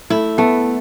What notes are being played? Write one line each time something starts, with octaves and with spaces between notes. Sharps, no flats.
A3 E4
A3 B3